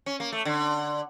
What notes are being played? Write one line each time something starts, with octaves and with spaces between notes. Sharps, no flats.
C#4
A#3
A3
D3